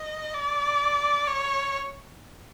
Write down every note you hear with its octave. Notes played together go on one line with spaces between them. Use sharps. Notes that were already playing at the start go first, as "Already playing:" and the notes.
Already playing: D#5
D5
C#5